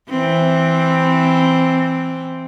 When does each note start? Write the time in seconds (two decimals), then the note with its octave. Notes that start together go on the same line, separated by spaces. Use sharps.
0.10 E3 C4